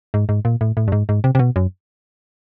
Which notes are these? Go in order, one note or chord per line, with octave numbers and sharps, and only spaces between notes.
G#2
G#2
A#2
A2
A2
G2
G#2
G#2
C3
C3
B2
F#2